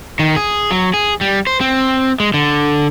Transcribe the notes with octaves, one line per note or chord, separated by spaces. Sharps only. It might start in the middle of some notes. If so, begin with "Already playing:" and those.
D#3
G#4
F#3
G#4
G3
C5
C4
G#3
D3